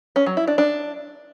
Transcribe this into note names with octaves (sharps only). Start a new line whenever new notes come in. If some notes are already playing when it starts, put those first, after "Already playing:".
C#4
F#3
E4
D4
D4